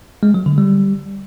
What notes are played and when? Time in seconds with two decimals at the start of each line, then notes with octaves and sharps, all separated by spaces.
0.23 G#3
0.34 F#3
0.46 D3
0.58 G3